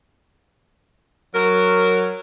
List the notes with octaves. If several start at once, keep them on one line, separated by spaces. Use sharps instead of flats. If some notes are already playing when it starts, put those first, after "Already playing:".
F#3 A#4